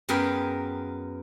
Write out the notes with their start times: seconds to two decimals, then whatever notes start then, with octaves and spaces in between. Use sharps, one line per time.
0.09 F#2 B3 G#4 A#4 G5 B5